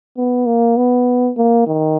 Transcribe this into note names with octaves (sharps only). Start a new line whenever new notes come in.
B3
A#3
B3
A#3
D#3